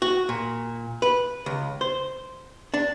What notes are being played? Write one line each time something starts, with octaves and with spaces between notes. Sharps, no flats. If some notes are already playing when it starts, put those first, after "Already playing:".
F#4
A#2
B4
C#2
C5
D4